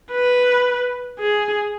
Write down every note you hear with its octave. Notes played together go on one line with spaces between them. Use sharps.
B4
G#4